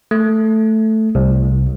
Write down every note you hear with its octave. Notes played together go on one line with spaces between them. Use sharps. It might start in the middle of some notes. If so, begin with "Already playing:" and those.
A3
C2